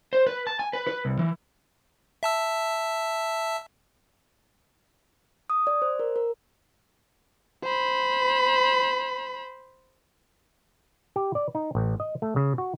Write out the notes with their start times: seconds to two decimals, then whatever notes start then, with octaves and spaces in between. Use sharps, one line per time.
0.13 C5
0.27 B4
0.47 A5
0.59 G#5
0.73 B4
0.87 B4
1.05 C2
1.19 E3
2.23 E5 A5 E6
5.50 D#6
5.67 D5
5.82 C5
5.99 A#4
6.16 A#4
7.64 C5 B5
11.16 G4
11.35 D5
11.55 D#4
11.75 A1
12.00 D#5
12.22 A3
12.36 C#3
12.58 F#4